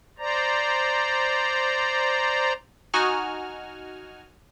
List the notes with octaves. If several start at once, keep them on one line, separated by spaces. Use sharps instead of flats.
C5 D5 A#5
D#4 F#4 G#5 F6